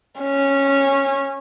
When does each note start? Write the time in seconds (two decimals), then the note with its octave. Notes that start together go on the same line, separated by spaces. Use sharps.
0.20 C#4